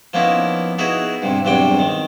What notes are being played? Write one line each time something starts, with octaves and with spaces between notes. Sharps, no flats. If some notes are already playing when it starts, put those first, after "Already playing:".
F3 A#3 B3 C#4 D#4 E4
B3 D#4 E4 F#4 G#4
G2 C3
E2 G2 C3 F#3 D4 G5
D#3